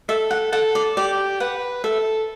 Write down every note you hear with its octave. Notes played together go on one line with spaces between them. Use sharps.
A4 E5
F#5
A4 F#5
D5
G4 D5
B4 F#5
A4 E5